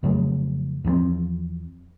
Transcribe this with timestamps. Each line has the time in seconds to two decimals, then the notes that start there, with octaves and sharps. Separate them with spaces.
0.03 F2 C#3 F#3 A3
0.84 E2 F3 A#3 C4